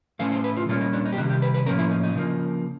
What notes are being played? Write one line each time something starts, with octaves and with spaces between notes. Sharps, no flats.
A2 E3 A3 C#4 F5
C5
B4
F4
A#2 G3 A#3 C#4 F4
D#4
D4
D#4
G4
C3 D#3 G3 F#4
G4
B4
B4
A2 F3 A#3 C#4 A#4
E4
D#4
D#4
C#3 F3 A#3